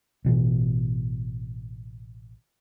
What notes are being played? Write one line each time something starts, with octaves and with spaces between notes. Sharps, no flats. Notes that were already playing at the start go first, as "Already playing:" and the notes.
A1 B2 E3